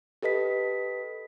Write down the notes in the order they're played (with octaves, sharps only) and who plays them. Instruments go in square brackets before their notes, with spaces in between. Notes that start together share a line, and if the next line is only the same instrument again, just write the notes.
[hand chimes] G4 A4 B4 D#5 B6